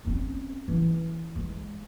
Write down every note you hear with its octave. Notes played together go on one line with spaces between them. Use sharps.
C4 C#4
E3
G#3